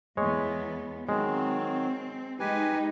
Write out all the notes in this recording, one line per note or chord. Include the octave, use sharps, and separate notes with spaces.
E2 G#3 B3 C#5
D#3 F#3 G#3 C4
G#3 D#4 G4 B4 G#5